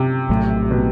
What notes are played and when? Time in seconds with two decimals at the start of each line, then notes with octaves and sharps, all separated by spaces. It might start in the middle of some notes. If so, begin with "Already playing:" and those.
Already playing: C3
0.29 A#1 A2 F#3 A3
0.71 B2